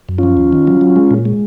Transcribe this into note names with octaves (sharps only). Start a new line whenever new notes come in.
F#2
F3 C#4 F4
D#2
D#3
F#3
F#3
G#3
A#2
G#3